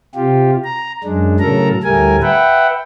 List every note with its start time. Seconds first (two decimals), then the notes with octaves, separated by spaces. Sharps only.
0.15 C3 F4 G4
0.65 A#5
1.04 F#2 G#3 D4
1.40 A2 C#3 F#3 A4 A#4 A#5
1.83 D2 A2 G3 A3 A#4 G#5
2.22 B4 E5 F#5 G5